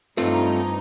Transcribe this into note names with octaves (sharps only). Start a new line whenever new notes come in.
G2 A3 C4 D#4 F4